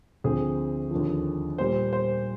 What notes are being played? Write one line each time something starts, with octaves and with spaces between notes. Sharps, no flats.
D2 D3 F3 C4 G#4
D#2 D3 F3
A#2 G3 A#3 C5
C5